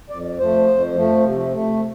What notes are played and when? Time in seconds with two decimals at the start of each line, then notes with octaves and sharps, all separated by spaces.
0.10 F2 D5
0.38 F3 A3 C5
0.67 F2
0.95 F3 A3
1.24 C3
1.52 A3